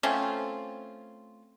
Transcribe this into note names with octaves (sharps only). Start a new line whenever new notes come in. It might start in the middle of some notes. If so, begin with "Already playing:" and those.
A3 C4 C#4 F4